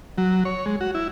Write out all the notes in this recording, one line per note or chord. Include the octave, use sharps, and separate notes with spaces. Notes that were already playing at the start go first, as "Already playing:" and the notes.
F#3
C#5
G#3
F#4
E4